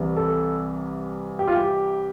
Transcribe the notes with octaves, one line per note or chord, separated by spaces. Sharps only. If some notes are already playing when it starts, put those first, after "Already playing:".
Already playing: C2 C3 E3
A4
G4
F4
G4